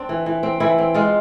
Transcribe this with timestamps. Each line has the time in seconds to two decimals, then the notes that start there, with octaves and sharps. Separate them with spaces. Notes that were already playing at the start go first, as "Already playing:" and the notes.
Already playing: C4 D4
0.09 E3
0.26 E3
0.43 C4
0.60 E3 E4
0.78 C4
0.94 G#3 F4